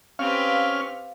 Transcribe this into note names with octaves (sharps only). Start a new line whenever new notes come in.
C4 C#4 G4 B4 F5 F6